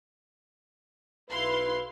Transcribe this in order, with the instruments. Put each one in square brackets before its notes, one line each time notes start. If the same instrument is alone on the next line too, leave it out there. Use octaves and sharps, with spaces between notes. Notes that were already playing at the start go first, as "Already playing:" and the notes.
[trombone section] B1 B4 [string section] E4 F5 C6